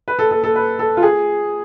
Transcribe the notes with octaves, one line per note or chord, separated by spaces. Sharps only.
B4
A4
A4
A4
B4
A4
F4
G#4